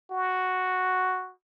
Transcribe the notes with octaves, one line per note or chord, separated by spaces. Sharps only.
F#4